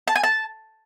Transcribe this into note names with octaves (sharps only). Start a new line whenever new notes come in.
A5
G#5
A5